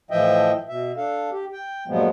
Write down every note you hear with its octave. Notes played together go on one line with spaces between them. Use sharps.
A2 E3 F3 D#5 E5 G5
B2 E5
D4 A4 F5
G4
G5
G2 A#2 F3 F#3 G#3 B3